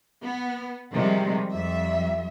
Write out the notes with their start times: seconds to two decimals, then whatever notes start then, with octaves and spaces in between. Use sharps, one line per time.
0.22 B3
0.93 C3 D#3 F3 G3 G#3
1.52 F2 G3 E5